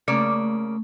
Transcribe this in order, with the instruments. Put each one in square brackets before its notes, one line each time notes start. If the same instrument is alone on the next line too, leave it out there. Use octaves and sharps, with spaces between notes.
[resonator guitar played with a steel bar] C#3 A#3 D5 [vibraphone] A3